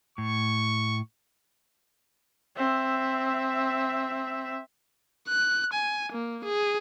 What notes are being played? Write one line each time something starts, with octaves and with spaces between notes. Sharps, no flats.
A2 C#6
C4 E5
F#6
G#5
A#3
G#4